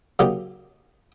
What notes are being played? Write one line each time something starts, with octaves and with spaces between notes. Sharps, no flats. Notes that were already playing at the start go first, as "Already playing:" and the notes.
C#3 F#3 A#3 D#4 G4